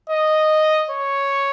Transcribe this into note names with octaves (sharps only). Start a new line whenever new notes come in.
D#5
C#5